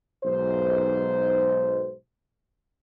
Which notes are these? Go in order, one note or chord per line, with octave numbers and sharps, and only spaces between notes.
B1 G#2 C5